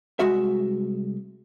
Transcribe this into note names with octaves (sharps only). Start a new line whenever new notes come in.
C2 G#3 F#4 E5